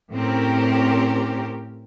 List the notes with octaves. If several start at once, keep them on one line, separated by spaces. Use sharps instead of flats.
A2 C4 C#4 G4 A#4